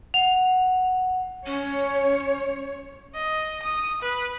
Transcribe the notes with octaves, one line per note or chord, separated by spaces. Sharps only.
F#5 F7
C#4 C#5
D#5
D#6
B4